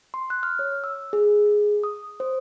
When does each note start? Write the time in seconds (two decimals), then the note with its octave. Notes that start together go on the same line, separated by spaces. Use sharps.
0.14 C6
0.30 F#6
0.43 F6
0.59 C#5
0.84 E6
1.13 G#4
1.84 D#6
2.20 C5